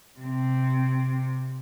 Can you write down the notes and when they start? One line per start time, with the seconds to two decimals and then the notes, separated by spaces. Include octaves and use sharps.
0.20 C3 C4